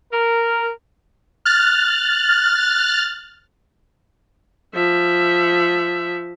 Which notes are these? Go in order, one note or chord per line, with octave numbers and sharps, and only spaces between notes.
A#4
F6 F#6 A6
F3 E5